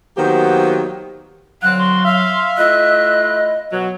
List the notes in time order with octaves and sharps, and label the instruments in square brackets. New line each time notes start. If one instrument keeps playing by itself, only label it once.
[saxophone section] D#3 F#3 A#3 B3 G4 C5
[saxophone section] D3 C4 F5 [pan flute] F#3 [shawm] F#5 [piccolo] F#6
[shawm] F#4 [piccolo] C6
[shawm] E5 [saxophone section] F5
[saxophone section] A3 E4 F4 [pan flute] D#5 [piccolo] F#6
[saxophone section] B2 F#3